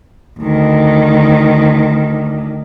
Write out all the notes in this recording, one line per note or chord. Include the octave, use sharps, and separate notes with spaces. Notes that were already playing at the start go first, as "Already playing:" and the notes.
D2 D#3